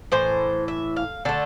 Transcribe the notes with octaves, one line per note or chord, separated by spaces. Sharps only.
A2 E3 C5
E5
F5
D3 A3 A5